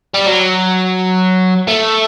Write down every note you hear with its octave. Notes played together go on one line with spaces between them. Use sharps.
G3
F#3
A3